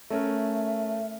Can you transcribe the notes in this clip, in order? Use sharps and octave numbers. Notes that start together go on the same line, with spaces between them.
A3 C#4 A#4 E5